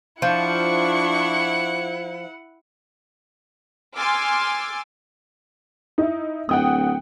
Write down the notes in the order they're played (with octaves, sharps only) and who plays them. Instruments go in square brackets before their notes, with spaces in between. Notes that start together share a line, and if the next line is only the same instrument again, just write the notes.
[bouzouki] F3 [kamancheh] D4 C#6 [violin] E4 F#5
[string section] G#5 C6 D6 E6 F6 A6
[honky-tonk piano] D#4 E4
[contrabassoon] D1 [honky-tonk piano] F#5 G5 D#6